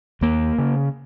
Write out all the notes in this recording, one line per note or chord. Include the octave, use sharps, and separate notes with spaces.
D#2 A#3
C#3